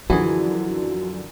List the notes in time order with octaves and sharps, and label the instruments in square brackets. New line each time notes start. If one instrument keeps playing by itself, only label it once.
[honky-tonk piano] F#2 D3 F3 [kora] E3 G#4 [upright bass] E4 [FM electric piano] F#4